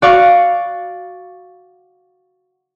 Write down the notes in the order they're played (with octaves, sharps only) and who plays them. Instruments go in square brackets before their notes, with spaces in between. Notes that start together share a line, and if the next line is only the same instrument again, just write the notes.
[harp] F#4 D5 F5 C#6